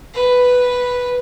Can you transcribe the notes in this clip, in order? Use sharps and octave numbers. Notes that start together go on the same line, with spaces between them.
B4